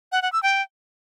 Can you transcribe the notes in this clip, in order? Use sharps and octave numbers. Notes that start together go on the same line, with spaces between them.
F#5
F#5
E6
G5